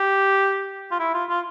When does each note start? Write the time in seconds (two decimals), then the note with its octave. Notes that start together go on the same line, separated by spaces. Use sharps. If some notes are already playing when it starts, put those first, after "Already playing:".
Already playing: G4
0.92 F4
1.00 E4
1.14 F4
1.29 F4